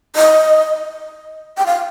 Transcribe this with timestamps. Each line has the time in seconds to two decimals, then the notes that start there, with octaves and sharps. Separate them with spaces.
0.16 D#5
1.58 G5
1.66 F5